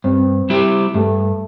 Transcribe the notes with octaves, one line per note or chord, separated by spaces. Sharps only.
G2 C4
G3 E4 G4
G2 A3